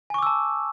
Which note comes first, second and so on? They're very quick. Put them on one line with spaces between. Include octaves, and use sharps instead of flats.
G#5 C#6 D6 E6 A5